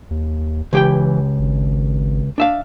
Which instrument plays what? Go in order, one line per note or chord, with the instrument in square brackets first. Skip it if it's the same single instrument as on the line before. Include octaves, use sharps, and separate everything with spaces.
[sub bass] D#2
[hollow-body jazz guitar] C#2 G4 G5 [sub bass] E3
[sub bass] G#1
[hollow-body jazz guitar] D4 E5 F5